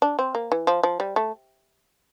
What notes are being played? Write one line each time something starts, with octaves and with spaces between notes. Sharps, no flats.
D4
C4
A#3
E3
F3
F3
G3
A3